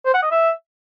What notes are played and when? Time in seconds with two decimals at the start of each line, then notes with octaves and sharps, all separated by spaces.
0.05 C5
0.14 F#5
0.23 D#5
0.31 E5